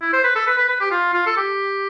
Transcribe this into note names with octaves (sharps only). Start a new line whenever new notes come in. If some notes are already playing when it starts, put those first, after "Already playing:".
E4
C5
B4
A4
B4
B4
B4
G4
F4
F4
A4
G4